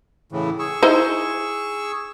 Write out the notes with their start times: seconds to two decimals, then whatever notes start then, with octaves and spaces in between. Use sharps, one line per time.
0.32 A2 C#3 E3
0.59 G#4 C#6 E6
0.83 D#4 E4 C5